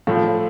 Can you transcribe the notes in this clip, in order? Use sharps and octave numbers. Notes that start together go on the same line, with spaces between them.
A2 F3 A3